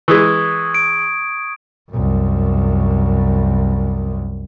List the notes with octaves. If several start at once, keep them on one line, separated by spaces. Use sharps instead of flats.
E3 G#3 C#6 D#6 G#6
D7
C2 F#2